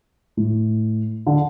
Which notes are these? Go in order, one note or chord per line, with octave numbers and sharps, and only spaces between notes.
A2
D3